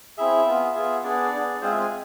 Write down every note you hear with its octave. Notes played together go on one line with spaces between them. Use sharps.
C4 E4 G#4 E5
B3 F4 G#4
B3 F4 G#4
B3 D4 G#4 D5
B3 D4 G#4
G#3 C4 F4 G#4 C5
E5
G#5